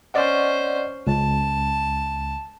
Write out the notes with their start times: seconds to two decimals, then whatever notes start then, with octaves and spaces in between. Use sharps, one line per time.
0.14 C#4 C5 D5 D#5 F#5
1.07 C#2 A5